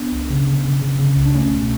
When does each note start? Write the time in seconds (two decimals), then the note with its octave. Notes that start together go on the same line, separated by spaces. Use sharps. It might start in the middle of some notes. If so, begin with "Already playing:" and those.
Already playing: B3 D4
0.12 C#2
0.30 C#3
0.47 C#3
0.65 C#3
0.82 C#3
0.99 C#3
1.16 C#2
1.26 D4
1.33 C#2 A3 C#4
1.51 B2